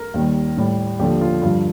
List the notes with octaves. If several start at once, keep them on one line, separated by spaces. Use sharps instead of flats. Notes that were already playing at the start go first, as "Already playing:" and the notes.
Already playing: A#4
D#2 D#3 G3
A2 G3
D#2 D3 F3 G4
F4
G2 D3 F3 F4